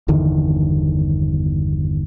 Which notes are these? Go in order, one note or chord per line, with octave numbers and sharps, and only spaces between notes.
G1 E2 D3 D#3